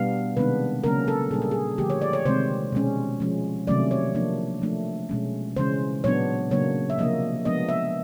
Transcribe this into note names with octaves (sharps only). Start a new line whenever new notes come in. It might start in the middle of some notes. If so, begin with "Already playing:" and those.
Already playing: B2 G3 B3 D4 F5
C3 D#3 G#3 B3 D4 B4
C#3 F#3 A#3 C#4 A#4
A4
A#2 G3 A#3 D4 G#4
A4
G#4
D3 F3 A3 G4
C#5
D5
C#5
C3 D#3 G#3 C4 C5
B2 G#3 C#4
F3 G#3 C#4
C3 D#3 F#3 A3 C#4 D5
C#5
F3 A#3 D4
F3 A3 D4
B2 G#3 C#4
C#3 E3 G#3 C#4 C5
A#2 F#3 B3 D4 C#5
C#3 F#3 A#3 D4 C#5
E5
C3 F3 A#3 D4 D#5
F3 G#3 B3 D4 D#5
E5